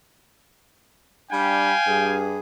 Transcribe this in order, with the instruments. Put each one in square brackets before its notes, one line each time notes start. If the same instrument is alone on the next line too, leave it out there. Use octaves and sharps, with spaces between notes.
[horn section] G3 D4 B5 [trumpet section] F5 G5 G#5
[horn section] G2 G#4